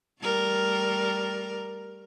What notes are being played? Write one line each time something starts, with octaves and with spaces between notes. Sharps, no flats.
G3 A3 A#4